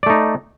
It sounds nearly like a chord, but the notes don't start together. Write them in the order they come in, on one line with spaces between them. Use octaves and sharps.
D5 A3 D#4